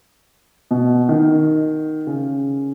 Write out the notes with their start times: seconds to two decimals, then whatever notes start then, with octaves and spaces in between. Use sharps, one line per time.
0.71 B2
1.09 D#3
2.07 C#3